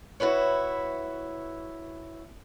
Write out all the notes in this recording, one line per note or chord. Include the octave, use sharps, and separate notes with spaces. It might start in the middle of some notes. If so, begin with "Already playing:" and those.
E4 F#4 B4 C#5